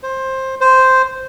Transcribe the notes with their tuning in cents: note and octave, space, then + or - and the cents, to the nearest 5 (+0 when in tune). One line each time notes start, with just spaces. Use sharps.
C5 +15
C5 -5